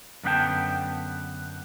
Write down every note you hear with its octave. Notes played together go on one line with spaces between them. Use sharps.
F#2 D3 B3 C#4 G5 A5